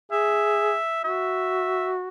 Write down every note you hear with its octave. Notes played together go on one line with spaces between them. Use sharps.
G#4 E5
F#4 E5